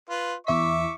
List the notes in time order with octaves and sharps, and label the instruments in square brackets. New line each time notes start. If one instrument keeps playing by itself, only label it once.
[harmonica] F4 B4
[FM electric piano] E2 E4 B6 [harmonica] E5 C#6 D6